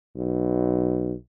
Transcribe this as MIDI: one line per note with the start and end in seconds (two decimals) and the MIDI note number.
0.17 1.12 35